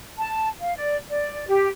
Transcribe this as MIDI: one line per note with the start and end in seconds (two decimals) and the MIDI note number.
0.17 0.47 81
0.59 0.74 77
0.76 0.97 74
1.10 1.46 74
1.48 1.69 67